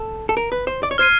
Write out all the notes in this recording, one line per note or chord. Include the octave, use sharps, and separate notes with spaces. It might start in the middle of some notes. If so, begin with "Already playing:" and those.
Already playing: A4
A4
A#4
B4
C5
D5
C#5
C5 F6 G#6 C7 D#7